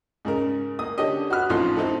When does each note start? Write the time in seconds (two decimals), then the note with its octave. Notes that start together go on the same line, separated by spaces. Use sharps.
0.25 G#2 C#3 A#4
0.79 A#3 D#6
0.98 D3 C#4 D4 G4 D#5
1.30 F#4 B4 F6 F#6
1.50 A1 F2 F3 D#4 F4 C6
1.77 C4 D#4 E4 A4